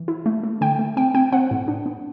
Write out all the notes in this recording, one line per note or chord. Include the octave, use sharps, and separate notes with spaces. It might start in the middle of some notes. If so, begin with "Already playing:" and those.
Already playing: E3
E4
A3
A3
D3 G5
A3
C4 G5
C4 G5
C4 F#5
A2
D4
B3